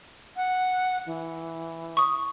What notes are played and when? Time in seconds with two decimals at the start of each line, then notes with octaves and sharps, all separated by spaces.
0.36 F#5
1.07 E3
1.97 C#6 D#6